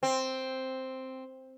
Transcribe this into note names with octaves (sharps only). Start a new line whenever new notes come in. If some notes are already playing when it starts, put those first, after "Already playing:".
C4